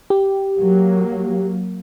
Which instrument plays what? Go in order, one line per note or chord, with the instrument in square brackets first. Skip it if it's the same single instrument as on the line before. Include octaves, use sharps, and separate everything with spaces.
[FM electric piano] G4
[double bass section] F#3 A#3